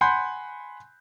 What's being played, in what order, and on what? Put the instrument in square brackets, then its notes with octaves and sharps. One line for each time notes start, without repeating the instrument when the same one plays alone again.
[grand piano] F#5 G#5 B5 C6 F#6 G6